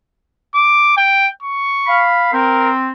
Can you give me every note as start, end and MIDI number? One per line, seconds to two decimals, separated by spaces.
0.55 0.96 86
0.97 1.29 79
1.43 2.07 85
1.87 2.33 77
1.87 2.33 83
2.33 2.90 60
2.33 2.71 70